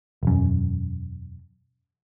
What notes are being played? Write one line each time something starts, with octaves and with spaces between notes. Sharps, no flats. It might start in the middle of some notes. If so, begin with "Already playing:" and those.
E1 F#2